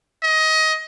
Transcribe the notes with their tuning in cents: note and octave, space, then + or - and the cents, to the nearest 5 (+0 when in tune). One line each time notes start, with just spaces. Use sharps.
D#5 +20